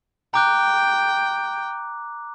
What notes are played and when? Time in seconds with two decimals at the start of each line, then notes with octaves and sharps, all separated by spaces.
0.34 G5 A#5 D6 F#6